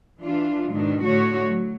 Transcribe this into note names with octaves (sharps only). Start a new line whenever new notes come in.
E3 D4 F4
G#2 B2 D#3 D4
A2 D3 A3 F#4 C#5
F#3